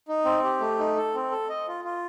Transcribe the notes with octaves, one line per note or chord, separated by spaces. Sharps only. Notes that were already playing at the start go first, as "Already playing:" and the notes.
D#4
C4
G4
A3
D#4
A4
C4
A4
D#5
F4
F4